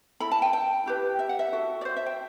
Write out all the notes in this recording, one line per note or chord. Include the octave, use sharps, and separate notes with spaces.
E4 A4 B5
A5
G5
G5
E4 G4 B4
E5
F#5
E5
F#4 A4
D5
C5
E5
G5